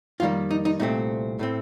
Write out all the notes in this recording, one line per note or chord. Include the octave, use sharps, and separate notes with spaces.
F2 D#3 G3 A#3 F4
D#4
D#4
C2 A#2 A3 C4 D#4
A2 A3 C4